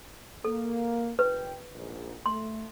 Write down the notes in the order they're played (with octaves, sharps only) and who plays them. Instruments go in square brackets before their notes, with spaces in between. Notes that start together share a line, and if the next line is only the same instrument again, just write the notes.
[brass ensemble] A#3 [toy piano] A4
[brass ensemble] F#1 G5 [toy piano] B4
[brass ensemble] A#1 G#2
[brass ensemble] A3 [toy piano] C6